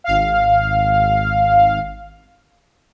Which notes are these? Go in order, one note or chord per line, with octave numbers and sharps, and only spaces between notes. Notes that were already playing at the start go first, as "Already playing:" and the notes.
G#1 F5